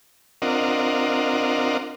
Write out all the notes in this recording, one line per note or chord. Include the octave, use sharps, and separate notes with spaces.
C4 D4 F4 A#4 D#5 F#5